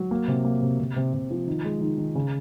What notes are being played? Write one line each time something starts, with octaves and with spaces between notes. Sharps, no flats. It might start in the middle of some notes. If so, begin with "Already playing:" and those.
Already playing: F#3
A#3
C3
A#3
C3
C3
C3
C3
F3
D#3
G#3
D#3
D#3
C#3